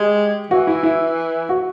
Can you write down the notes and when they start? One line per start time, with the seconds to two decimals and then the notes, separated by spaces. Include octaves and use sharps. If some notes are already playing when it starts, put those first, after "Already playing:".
Already playing: G#3 G4
0.50 E3 F#4
0.67 E4
0.83 E4
1.49 F#4